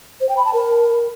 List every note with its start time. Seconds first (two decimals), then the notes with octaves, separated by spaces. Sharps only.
0.21 C5
0.29 G5
0.37 B5
0.45 A5
0.54 A#4